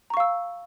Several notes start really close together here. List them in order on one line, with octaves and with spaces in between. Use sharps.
A#5 C#6 F5 E6